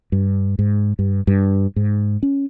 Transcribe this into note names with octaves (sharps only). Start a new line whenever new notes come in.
G2
G#2
G2
G2
G#2
C#4